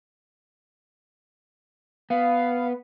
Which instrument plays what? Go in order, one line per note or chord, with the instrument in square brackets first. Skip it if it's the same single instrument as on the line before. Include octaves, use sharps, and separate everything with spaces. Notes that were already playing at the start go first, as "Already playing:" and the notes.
[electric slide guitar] B3 [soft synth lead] F5